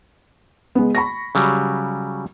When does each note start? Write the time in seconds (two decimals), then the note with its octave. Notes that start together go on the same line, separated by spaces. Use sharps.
0.75 G#3 B3
0.95 B5 C#6 A#6
1.35 C#3 F#3 G3